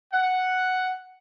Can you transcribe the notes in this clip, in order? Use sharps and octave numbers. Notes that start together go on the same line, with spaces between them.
F#5